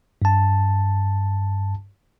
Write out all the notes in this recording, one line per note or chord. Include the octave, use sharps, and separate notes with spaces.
G2 A5